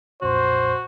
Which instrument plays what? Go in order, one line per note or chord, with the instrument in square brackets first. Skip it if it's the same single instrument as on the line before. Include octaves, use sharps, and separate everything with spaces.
[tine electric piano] B1 F2 A#2 [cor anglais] F#4 [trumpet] C5